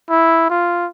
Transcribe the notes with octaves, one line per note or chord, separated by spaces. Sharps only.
E4
F4